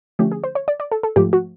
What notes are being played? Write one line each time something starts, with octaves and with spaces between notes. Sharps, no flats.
D3 F3 A3 C#4 G4
G#4
C5
C#5
D5
D5
A4
A4
G#2 F3 A3 G4
F#4